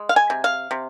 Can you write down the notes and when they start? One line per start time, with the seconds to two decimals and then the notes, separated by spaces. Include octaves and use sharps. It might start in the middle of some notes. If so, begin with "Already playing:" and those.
Already playing: G#3
0.09 F5
0.16 G#5
0.30 C3
0.44 F5
0.71 C3